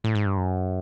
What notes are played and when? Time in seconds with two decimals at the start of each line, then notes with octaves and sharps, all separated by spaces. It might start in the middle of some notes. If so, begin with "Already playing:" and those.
0.04 A2
0.15 G#2
0.26 G2
0.37 F#2